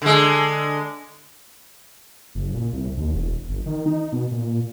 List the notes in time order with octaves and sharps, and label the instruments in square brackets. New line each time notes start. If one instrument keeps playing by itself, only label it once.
[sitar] D3 G#3
[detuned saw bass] F#1
A#2
C2
D#2
E1
G1
D#3
D#4
B2
A#2